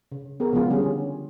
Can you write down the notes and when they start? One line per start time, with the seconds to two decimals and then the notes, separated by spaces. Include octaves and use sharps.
0.12 C#3
0.40 B3 G#4 A#4
0.53 C#3 F3 G#3 B3 F4
0.70 D3 G3 C#4 G#4